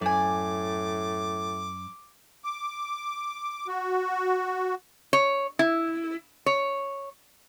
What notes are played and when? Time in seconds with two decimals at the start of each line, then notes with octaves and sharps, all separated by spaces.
0.01 F#2 A2 D5 G#5 D6
2.44 D6
3.67 F#4
5.13 C#5
5.59 E4
6.46 C#5